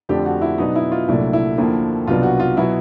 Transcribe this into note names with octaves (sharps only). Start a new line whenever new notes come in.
F2 D3 F3 A3 D4 G4
F#4
E4
B2 F#3 B3 D4 D#4
E4
F4
C2 A#2 F#3 A3 D4 E4
E4
D#2 D3 F3 A#3 E4
C2 B2 F#3 B3 D4 F4
F#4
F4
B2 F#3 B3 E4